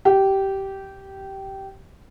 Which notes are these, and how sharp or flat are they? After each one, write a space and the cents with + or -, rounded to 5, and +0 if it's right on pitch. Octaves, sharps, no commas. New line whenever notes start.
G4 -15